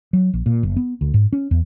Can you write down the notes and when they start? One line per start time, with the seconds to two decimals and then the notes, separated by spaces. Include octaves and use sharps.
0.13 F#3
0.33 A#1
0.46 A#2
0.63 F#1
0.76 B3
1.01 D2
1.14 G#2
1.33 C#4
1.51 E2